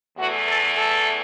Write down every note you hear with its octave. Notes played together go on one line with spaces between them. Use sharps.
E2 E3 A3 F#4
A4
A4